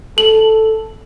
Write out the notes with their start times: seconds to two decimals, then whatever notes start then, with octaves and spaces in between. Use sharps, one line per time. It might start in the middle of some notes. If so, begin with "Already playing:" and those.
0.18 A4 F#7